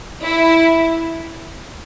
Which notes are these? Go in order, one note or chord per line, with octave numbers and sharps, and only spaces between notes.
E4